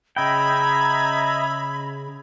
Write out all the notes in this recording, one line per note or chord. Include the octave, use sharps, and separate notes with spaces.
C#3 D#5 E5 G5 A#5 B5 G#6